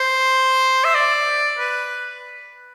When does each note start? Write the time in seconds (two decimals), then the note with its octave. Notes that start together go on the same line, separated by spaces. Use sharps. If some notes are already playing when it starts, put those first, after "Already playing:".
Already playing: C5
0.84 E5
0.95 D5
1.59 B4